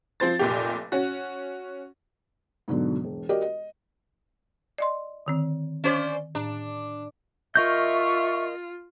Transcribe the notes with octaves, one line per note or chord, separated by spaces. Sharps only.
F3 C4 C5 A6
F1 A#2 G4
C#4 F#4
G#2 B2 D3 F#3
E1
F#4 G4 A#4 D5 D#5
D#5
D5 D#5 C6
D3 D#3 C4
C#4 C5 D5
A2 D4
F4 A#4 D#5 E5 C#6 G6